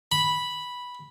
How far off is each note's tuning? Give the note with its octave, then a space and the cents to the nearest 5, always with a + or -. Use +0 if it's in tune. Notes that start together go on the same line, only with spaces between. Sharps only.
B5 -5